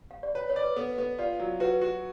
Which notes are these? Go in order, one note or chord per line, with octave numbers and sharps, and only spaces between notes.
F5
D5
B4 C#5
C#5
D5
B4
B3 A4
B3 A4
F4 D5
F#3
F#4 B4
F#4